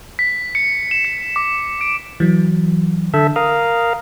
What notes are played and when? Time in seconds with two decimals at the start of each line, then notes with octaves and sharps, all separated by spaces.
0.19 B6
0.55 C#7
0.91 E7
1.05 C#7
1.36 D6
1.81 D7
2.20 E3 F#3
3.14 D3 A4 E5
3.36 A#4 F5 D#6